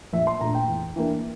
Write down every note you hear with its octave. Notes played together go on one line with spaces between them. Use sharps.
A#1 E5
C6
A#2 A3 D4 A#5
G5
E2
E3 A#3 D4